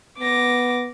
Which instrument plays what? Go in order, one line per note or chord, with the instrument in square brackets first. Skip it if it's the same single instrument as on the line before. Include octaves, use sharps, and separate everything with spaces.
[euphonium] B3 [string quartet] D6 A#6